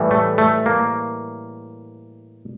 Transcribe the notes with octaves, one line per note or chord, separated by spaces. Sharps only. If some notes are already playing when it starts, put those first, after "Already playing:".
Already playing: A2 E3 G3
A3
A3
A#3